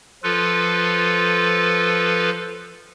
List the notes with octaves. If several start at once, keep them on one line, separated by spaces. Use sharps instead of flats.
F3 F4 A4 B4